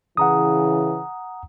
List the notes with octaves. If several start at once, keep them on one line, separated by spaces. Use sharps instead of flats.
C#3 E3 F#5 A#5 D#6